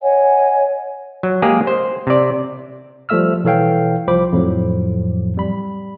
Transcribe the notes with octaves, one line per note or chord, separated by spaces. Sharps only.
C#5 D#5 F#5 G#5
F#3
G#3 A#3 G4 G#4
C5
C3 D5
F3 G3 A3 E5 E6 F6
B2 E3 A4 C#5 F5 G5
C2 F3 C5 B5 D6
F2 A2 F3 F#3
G3 B5